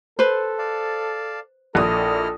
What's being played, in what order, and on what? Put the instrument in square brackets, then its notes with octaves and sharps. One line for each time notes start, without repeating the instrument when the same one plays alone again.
[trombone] A4 [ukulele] B4 C5
[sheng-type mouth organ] D5 F5 A5
[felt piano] A#1 A#2 D#6 [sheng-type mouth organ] E4 D#5 F6 [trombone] A4